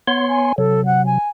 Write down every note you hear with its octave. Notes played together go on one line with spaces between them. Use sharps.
B3 C#5 C6
G#5
C3 F#3 A4
F#5
G#5